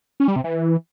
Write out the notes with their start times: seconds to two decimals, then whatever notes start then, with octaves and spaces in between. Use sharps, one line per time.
0.20 C#4
0.28 G3
0.36 C3
0.44 E3